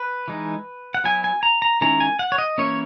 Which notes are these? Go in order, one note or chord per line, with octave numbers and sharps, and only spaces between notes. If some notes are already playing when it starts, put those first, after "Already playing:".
Already playing: B4
E3 G#3 D#4
F#5
F#3 B3 E4 G#5
G#5
A#5
A#5
D#3 G#3 C#4 E4 A#5
G#5
F#5
C#5
D#5
E3 A#3 C#4 E4 C#5